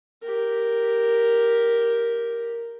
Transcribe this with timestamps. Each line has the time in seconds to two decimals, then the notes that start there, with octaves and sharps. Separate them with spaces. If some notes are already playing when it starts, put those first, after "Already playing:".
0.22 G4 A#4